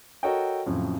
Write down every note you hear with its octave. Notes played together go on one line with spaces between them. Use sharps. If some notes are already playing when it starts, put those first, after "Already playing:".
F#4 A4 A#4 C#5 D#5 G5
F2 A2 C#3 F3 F#3